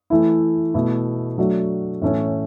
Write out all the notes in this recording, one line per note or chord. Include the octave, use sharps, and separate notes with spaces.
E3 A3 E4
B2 A3 E4
F#3 A3 D4 F#4
A2 E3 A3 C#4